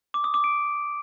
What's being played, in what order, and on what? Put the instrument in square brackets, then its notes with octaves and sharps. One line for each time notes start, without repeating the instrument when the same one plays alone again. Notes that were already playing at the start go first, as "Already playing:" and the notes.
[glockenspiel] D6
D#6
D6
D7